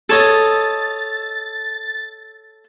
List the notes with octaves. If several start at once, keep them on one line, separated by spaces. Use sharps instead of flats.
A4 C#5 D#5 A6